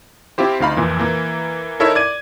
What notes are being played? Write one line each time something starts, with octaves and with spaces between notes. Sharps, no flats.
C4 E4 F4 G4 C5
D2 D#4 F5 B5
F2 A#2 E3
E3 A#3
D#4 E4 A4 A#4 C#5 E5
D5 G#6 D#7